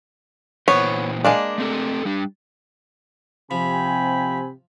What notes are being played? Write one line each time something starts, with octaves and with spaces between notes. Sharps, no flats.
A#2 E3 B3 C5 C#5
G#3 A#3 D4
A3 C4 A4
G3 D4
C3 F3 C4 G5 G#5 B5